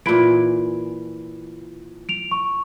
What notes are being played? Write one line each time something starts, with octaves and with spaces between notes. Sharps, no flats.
A#2 E3 B5 D7
D7 F7
C#6